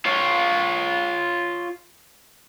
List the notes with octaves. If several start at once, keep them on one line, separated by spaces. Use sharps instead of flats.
F4 C#5